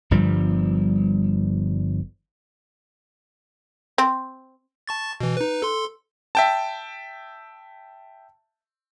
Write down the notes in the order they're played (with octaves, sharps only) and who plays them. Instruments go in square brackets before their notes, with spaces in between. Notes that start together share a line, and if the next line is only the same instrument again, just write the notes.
[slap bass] G1 G2 F3 G3
[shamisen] C4
[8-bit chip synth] A5 C#6 A6
B2 E3
D#4 B4
A4 C6
[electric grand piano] E5 G5 A5